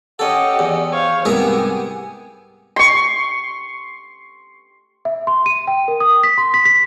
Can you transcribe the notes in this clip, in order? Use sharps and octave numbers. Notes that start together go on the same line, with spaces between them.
C#4 G4 A4 D#5 F#5
E2 D5 G#5
C5 C#5 F5
C2 G#2 B3 G4 G#4 A#4 E5 G#5
C6 C#6
E5
C6
D#7
G5
A#4
D#6
B6
C6
B6
B6